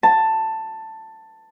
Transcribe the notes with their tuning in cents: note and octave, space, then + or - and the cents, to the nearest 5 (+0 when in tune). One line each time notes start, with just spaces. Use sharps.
A5 +10